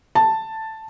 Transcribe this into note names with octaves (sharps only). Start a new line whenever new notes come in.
A5